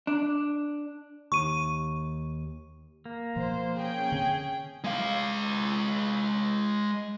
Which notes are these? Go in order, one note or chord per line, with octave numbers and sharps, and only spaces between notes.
D4
D#2 C#6 D#7
A#3
B2 F3 C5
C#4 G#4 G5
D3 C4
G#3 F5